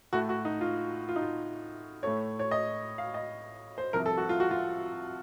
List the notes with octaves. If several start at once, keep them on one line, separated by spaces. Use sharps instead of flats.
A2 A3 F#4
F#4
D#4
F4
F4
D#4
F4
A2 A3 C#5
C#5
D#5
F5
D#5
C5
C2 C3 F3 A#4
A4
F#4
F4
F#4
F4